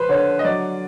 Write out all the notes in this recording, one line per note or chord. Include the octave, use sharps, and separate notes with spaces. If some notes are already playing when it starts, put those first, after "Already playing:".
Already playing: F3 B4 C5
D3 C#5
D#5
F#3 D5